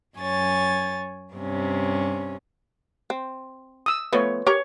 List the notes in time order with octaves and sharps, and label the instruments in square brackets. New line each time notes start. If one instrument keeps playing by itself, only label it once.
[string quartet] F#2 C#5 G#5 A6
G2 C3 C#4
[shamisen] C4
[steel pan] D#6 E6
[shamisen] F3 A3 B3 [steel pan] B4 C#5
[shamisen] G4 A#4 A#5 [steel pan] C#5